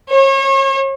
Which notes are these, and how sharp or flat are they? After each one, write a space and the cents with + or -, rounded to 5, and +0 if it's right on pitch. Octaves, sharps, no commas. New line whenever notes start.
C#5 -35